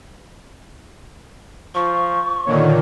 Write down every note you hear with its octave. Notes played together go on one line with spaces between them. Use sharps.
F3 C#6
A#2 D3 D#3 C#5